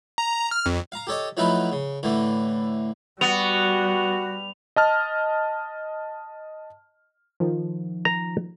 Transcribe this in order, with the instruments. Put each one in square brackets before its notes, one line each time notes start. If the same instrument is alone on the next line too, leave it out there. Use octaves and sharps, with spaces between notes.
[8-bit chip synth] A#5
F6
F2
[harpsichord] F5 A#5
G4 A4 C#5 D#5
F3 F#3 A3 D#4 E4 B4
C#3
A2 D3 E3 A3
[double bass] G3 [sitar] B3 [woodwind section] F#4 [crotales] F7
[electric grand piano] D#5 A5 F6
[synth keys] D#3 F3
[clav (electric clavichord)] A#5